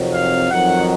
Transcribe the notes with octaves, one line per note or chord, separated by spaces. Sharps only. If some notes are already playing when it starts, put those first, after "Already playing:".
Already playing: F2 C3 D#3 F#3
F5
F2 D#3 F#3 F#5